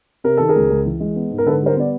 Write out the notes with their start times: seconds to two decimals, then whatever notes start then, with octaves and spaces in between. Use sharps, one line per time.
0.24 C3 A#4
0.37 D#3 A4
0.48 G#4 A#4
0.56 C#2
0.70 C#2
0.85 E3
1.00 G#3
1.16 B3
1.31 G#2
1.38 A#4
1.46 D3 A4 B4
1.62 G3 A#4 C5
1.76 B3 D5